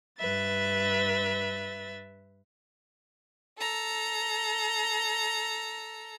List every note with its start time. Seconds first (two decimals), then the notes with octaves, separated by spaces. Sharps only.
0.18 G2 B4 E5 A6
3.59 A4 A#5